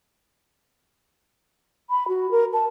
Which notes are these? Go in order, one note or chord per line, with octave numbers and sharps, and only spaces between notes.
B5
F#4
A#4
A5